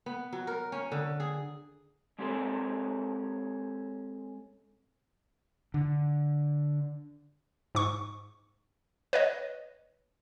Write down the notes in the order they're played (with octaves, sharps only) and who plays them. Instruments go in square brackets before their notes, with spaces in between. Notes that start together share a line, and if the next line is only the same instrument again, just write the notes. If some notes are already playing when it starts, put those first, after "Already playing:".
[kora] B3
F#3
A#4
C#4
D3
G#4
[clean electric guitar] G#3 C4 C#4 G4 A4 A#4
[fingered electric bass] D3
[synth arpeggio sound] G#2 C#6
B4 C#5 D#5